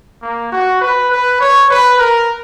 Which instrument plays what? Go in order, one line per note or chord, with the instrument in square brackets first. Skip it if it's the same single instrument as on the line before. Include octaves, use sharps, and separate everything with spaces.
[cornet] A#3
F#4
B4
B4
C#5
B4
A#4